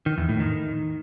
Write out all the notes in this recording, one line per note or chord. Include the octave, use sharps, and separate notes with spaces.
D#3
E2
A2
D#3